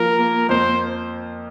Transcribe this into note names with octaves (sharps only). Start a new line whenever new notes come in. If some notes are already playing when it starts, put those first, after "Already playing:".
Already playing: F3 A#3 A#4
A#3
F2 C5